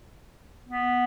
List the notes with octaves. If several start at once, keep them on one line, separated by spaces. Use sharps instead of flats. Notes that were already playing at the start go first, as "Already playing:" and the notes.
B3